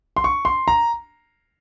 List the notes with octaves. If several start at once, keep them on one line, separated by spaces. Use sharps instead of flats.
C6
C#6
C6
A#5